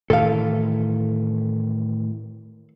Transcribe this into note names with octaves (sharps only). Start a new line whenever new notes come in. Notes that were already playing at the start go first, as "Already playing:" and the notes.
A2 D#3 E3 A4 F5